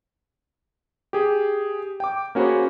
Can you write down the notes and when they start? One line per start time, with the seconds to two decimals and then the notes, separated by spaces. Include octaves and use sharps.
1.13 G4 G#4
2.00 G5 D6
2.35 A#3 C#4 F#4 G#4 C5 B5